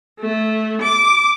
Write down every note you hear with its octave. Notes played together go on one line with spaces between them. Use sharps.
A3
D6